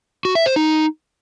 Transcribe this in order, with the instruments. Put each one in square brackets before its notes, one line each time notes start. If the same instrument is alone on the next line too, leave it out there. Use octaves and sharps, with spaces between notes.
[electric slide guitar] F#4
E5
C5
D#4